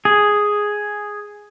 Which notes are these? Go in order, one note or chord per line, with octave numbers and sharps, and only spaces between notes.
G#4